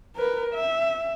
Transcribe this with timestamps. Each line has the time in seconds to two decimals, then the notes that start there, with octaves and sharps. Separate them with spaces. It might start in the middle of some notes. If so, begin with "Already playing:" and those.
0.16 A#4 B4
0.54 E5